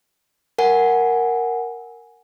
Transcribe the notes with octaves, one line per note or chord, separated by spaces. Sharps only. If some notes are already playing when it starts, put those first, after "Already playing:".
A#4 F#5 G#5